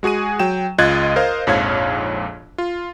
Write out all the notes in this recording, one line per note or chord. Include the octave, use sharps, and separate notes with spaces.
G#3 F#4 G#4 G#5 D#7
F#3 G5 E7
C#2 F4 D#5 F#6 G#6 A6
A#4 C5 D#5 F5
A#1 F2 G#2 C#5 F5 G#6
F4